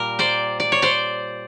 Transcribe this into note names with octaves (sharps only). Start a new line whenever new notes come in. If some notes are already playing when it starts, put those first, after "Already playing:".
Already playing: A#2 G3 A#4
C5 D5
D5
C#5
C5 D5